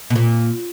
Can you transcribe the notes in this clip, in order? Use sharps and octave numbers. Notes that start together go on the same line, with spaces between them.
B2
A#2